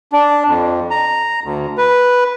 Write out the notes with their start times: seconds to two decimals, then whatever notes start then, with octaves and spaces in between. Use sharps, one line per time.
0.12 D4
0.48 F2
0.91 A#5
1.44 D2
1.78 B4